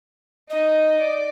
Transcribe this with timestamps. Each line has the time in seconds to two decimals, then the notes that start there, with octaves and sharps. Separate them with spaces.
0.50 D#4 D#5
1.00 D5